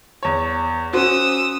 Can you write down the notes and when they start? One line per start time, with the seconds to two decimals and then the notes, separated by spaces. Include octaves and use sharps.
0.23 E2 C#5
0.93 C#4 F#4 C5 D#6 E6 F#6